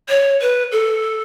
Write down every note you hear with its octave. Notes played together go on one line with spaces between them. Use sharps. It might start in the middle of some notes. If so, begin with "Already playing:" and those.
C#5
B4
A4